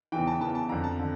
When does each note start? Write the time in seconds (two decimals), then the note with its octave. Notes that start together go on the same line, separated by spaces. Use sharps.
0.12 E2 C#3 E3 G5
0.27 A5
0.41 E2 C#3 E3 A5
0.55 A5
0.69 F2 D3 A#5
0.84 A5
0.99 D3